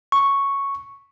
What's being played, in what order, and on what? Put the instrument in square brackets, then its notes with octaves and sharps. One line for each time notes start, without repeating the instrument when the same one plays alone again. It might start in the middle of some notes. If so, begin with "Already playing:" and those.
[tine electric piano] C#6